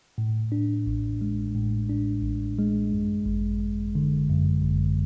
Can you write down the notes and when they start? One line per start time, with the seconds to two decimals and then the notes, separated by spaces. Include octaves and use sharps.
0.18 A2
0.52 D4
0.86 A1
1.21 G#3
1.55 A2
1.89 D4
2.23 A1
2.58 G#3
2.93 F#2
3.26 G#1
3.60 G#1
3.95 D3
4.30 F#2
4.63 G#1